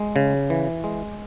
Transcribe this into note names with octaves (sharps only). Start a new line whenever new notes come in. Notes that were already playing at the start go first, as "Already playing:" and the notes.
Already playing: G#3
C#3
E3
G#3